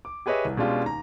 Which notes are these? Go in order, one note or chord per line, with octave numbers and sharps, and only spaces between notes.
D6
G4 G#4 B4 C#5 D#5 E5
C2
B2 G#3 C#4 D4 F4 G4
D#2 A#5